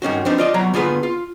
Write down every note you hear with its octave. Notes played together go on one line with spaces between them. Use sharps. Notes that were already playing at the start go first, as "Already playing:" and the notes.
G2 D#3 C#4 F#4
F3 B3 C4 D4 D#4
F4 D5 D#5
F#3 B3 C#5 A#5
D3 B3 F4 G#4 B4
F4